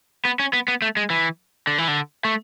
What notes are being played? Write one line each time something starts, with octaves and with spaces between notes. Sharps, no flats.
B3
C#4
B3
B3
A3
G#3
E3
D3
E3
D3
A3